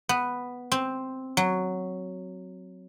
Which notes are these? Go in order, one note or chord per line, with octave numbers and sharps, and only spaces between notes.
B3
C4
F#3